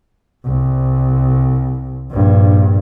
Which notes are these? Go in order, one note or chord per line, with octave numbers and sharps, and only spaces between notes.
C2
A#1 G2